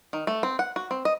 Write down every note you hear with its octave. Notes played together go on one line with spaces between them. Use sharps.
D#3
A3
C4
F#5
F#4
C4
D#5